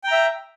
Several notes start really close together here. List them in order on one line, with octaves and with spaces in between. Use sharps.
G5 A#5 E5